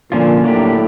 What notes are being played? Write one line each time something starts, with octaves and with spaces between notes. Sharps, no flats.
A#2 D3 F3 A#3 C#4 F4
A2 F#3 A#3 D4 G4